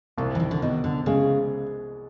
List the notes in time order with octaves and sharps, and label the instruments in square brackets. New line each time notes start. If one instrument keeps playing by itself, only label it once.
[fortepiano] C2 [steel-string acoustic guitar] A#2
[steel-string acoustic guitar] E3
D#3
D3
[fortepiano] B2 [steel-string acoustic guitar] D#3
[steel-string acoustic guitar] D3
[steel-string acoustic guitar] C#3 [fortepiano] G#3